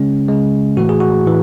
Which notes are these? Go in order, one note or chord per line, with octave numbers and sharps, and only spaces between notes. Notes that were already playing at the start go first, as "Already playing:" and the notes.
Already playing: C#3 G#3 C#4
C#3 G#3
A2 E3 A3 F#4
G#4
F#4
A2 E3